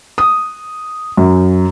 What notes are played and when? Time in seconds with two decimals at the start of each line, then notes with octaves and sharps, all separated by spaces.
0.18 D#6
1.17 F#2